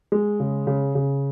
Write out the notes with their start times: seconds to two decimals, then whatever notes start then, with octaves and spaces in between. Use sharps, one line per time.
0.12 G#3
0.40 C#3
0.67 C#3
0.95 C#3